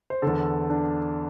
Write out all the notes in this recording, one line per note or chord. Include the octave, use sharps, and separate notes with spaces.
C5
E2 D3 A4
D4